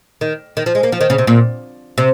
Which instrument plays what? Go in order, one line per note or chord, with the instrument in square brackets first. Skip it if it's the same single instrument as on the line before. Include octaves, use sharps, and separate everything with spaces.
[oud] D#3
D#3
F3
G#3
A#3
F3
D#3
C#3
C3
A#2
C3